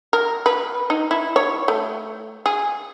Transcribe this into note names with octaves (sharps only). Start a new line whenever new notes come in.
A#4
B4
D#4
E4
C#5
A3
G#4